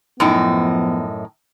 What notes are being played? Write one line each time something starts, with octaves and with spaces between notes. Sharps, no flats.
F#2 A2 F3 B3 D#4